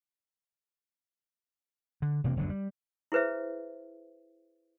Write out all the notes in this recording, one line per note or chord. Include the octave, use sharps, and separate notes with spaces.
D3
E1 C3 A#3
F#1 D2 D3 F#3
G3
E4 G#4 B4 C5 E5